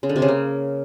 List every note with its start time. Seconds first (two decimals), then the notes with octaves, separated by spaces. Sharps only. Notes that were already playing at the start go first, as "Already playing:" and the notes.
0.03 C#3
0.09 D3
0.16 C3
0.22 C#3
0.28 A#3